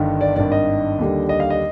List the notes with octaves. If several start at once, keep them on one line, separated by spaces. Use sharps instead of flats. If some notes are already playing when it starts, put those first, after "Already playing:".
Already playing: G1 G2 D#3
D5
G#1 G2 D#3 D5
D#5
D#2 D3 G3
D#5
F5
D#5